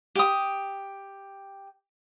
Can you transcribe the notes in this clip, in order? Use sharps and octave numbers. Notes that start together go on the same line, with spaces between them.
G4 D#6